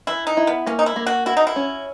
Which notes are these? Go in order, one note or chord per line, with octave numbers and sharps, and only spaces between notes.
E3 E4
D#4
E4
B3
A#3 C#4
D#4
E4
A#3
F#4
E4 F#4
D#4
E4
C#4